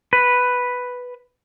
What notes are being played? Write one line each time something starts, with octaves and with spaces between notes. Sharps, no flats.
B4